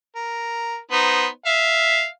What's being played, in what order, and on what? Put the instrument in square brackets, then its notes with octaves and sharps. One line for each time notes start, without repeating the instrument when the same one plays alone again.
[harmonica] A#4
B3 D#4 C5
E5 F5